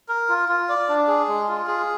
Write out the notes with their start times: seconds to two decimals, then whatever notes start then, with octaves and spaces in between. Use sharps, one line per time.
0.08 A#4
0.29 F4
0.49 F4
0.69 D5
0.89 D4
1.08 G#4
1.28 G#3
1.49 F4
1.67 G#4